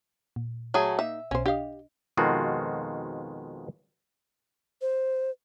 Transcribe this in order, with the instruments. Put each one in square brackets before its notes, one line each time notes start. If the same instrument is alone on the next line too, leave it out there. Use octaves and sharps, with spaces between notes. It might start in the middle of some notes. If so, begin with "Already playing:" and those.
[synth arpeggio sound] A#2
[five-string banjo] F#3 A3 G#4
[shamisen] A#3 D#4 [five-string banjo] E5
[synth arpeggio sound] B1 B2 [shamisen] C#4 C5
[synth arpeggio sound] D4 D#5 [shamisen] G4 F5
[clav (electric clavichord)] F2 B2 D#3 G#3 F4 F#4
[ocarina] C5